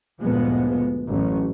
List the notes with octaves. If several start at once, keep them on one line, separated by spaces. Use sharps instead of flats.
D2 G2 A#2 F3 G#3 B3
A1 F#2 C#4